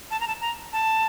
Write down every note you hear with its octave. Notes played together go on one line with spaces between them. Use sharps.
A5
A#5
A5
A#5
A5